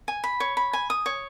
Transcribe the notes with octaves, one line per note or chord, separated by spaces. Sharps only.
G#5
B5
C#5
B5
G#5
D#6
C#5